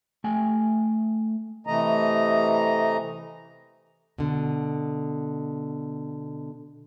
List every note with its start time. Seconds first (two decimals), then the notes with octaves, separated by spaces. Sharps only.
0.24 A3 G5 G#5
1.67 C3 E3 A3 D#5 A#5
4.18 B2 D3